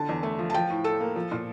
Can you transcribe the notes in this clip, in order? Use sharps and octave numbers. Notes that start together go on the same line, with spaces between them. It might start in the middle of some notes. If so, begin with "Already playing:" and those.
Already playing: D3 A5
E2
A3
F3
A5
F3 G5
A2
A2 A4
A#3
F3
A#2